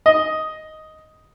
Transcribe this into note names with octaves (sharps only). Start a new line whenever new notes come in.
D#5